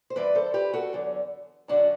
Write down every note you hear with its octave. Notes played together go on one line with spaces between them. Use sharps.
C5
G2 E3 B4 D5
A4 C5
G4 B4
F#4 A4
E2 D3 F#3
F#2 D3 F#3 D4 F#4